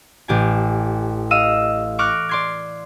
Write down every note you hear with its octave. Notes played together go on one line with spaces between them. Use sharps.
A1 G4 G#5
D#5 F5 E6 D#7 E7
C#6 D6 F6 F#6 A#6 D7
D5 C6 G#6